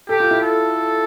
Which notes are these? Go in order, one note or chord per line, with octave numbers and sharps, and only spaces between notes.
G4 A4
F4
E4
A4